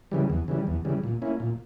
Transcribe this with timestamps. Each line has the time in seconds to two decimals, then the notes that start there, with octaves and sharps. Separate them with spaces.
0.12 C#3 E3 G3
0.30 E2
0.48 C#3 E3 G3
0.67 E2
0.85 C#3 E3 G3
1.04 A#2
1.22 A#3 C#4 E4
1.40 A#2